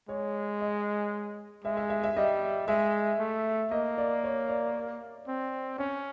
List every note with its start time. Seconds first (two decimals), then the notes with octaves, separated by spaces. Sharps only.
0.09 G#3 C#5
0.61 D#5
1.64 G#3 E5
1.77 E5
1.90 E5
2.03 E5
2.16 G3 D#5
2.67 G#3 E5
3.19 A3
3.71 A#3 D#5
3.98 D5
4.24 C#5
4.49 D5
5.27 C4
5.78 C#4 C#5